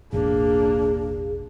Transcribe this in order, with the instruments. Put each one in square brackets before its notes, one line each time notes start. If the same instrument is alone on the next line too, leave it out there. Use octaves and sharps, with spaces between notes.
[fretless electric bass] E1 A1 [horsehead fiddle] A#3 D4 [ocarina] G#4